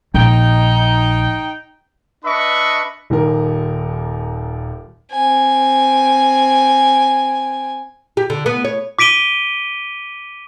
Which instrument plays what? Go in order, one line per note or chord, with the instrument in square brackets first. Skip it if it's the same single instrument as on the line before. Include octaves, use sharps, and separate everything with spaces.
[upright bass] A#1 [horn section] D#4 G5
[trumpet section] D4 B4 D#5 E5 B5 C#6
[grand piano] D#1 D#2 A#4
[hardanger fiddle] C4 G#5
[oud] G4
D3
B3
C#5
[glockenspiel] D6 B6 D7 D#7 G7